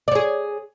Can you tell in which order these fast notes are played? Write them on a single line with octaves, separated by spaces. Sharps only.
D5 C#5 G#4